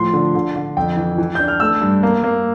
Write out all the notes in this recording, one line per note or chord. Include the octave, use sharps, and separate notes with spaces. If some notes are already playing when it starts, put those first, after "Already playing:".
Already playing: A2 F3 C6
D3
D3
D3
F2 G5
E3
E3
D4 G6
F6
A3 E6
G2
A#3
A#3